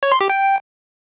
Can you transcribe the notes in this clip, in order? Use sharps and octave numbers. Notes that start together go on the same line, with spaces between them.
C#5
C6
G4
G5